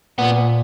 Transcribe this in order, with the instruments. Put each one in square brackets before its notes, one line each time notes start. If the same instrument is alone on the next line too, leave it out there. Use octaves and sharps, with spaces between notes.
[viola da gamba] A#2 [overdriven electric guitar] B3